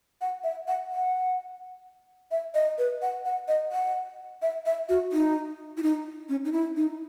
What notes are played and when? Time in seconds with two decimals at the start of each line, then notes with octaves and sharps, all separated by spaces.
0.21 F#5
0.44 E5
0.68 F#5
0.91 F#5
2.31 E5
2.55 D#5
2.78 B4
3.02 F#5
3.25 F#5
3.48 D#5
3.72 F#5
4.42 E5
4.66 E5
4.89 F#4
5.12 D#4
5.77 E4
5.83 D#4
6.29 C#4
6.45 D#4
6.52 E4
6.77 D#4